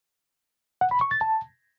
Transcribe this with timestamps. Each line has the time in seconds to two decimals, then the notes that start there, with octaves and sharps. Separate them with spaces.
0.81 F#5
0.91 B5
1.01 C#6
1.11 A6
1.21 A5